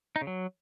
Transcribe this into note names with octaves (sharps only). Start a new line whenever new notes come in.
D#4
C#3
F#3